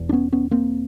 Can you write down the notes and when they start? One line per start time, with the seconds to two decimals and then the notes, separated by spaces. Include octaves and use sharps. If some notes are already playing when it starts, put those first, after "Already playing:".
Already playing: E1 E2
0.09 D4
0.12 B3 C#4
0.32 B3 C#4
0.51 A#3 C4